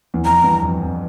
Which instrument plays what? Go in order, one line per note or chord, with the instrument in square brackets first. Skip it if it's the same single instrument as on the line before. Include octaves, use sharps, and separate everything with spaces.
[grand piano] E2
[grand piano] F2 [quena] A#5
[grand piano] E2 G2
F2
F2